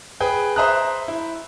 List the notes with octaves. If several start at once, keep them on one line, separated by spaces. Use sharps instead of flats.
G#4 B4 G5
C5 E5 A#5 D#6 F#6
E4